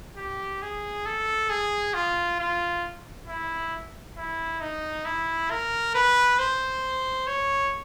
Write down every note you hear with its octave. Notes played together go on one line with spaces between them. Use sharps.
G4
G#4
A4
G#4
F4
F4
E4
E4
D#4
E4
A#4
B4
C5
C#5